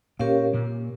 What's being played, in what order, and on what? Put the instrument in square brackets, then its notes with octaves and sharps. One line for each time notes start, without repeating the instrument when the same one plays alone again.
[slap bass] A#2 A#3 [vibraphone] C#4 G4 A#4 C#5 F5
[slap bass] A#2 A#3